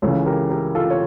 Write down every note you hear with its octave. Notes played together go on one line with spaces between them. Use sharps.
C#2 C#3 E3 A4 C#5
G4 A#4
G4 A#4
F4 A4
C#5